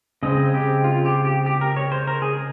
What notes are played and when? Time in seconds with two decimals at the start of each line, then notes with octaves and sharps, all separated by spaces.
0.23 C#3 G#3 C4 D#5
0.54 G4
0.84 F4
1.05 G4
1.25 G4
1.46 G4
1.61 A#4
1.77 C#5
1.92 C5
2.07 A#4
2.22 G#4